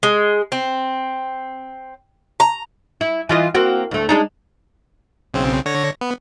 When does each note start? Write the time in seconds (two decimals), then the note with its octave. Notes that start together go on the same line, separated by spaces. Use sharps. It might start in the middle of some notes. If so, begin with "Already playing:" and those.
0.03 G#3
0.52 C4
2.40 A#5
3.01 E4
3.29 E3 F4 D#5
3.55 A#3 C4 F#4
3.91 D2 A3
4.09 G#3 D4 D#4
5.34 B1 C#3 C4
5.66 D3 C#5 A#6
6.01 B3